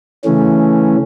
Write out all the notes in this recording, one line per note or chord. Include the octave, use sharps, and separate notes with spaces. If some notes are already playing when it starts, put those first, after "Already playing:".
C#3 E3 A3 C#4